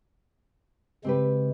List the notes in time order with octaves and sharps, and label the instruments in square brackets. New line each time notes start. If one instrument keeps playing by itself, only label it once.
[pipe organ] C#3 G#3 [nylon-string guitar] C4 G4 B4